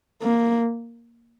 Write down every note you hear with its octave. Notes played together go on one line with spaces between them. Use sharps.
A#3